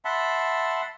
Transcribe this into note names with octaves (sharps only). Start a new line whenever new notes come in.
E5 F#5 A5 B5 C6